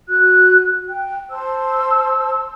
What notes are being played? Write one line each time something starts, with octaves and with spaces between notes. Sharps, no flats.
F#4 F#6
G5
C5 A5 E6